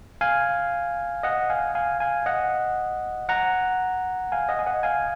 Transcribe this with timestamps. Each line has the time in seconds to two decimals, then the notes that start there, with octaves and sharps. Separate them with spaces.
0.21 F5 G#5
1.23 D#5 F#5
1.50 F5 G#5
1.75 F5 G#5
2.00 F5 G#5
2.26 D#5 F#5
3.29 F#5 A#5
4.32 F5 G#5
4.49 D#5 F#5
4.59 G#5
4.66 D#5 F#5
4.83 F5 G#5